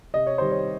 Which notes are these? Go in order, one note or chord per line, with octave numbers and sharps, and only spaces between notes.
C3 D#5
C#5
D#3 G3 C5
C#5